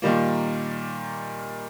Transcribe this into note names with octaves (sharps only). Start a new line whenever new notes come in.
A#2 D#3 G3 A#3